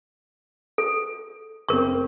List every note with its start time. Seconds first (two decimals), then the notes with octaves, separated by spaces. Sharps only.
0.78 A4
1.69 F#1 A3 C4 A#4 C#6